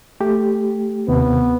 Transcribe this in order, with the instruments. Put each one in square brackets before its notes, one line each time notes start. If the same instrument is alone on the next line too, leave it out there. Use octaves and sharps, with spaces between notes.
[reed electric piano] A3 G4
[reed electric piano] D#2 C3 [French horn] B3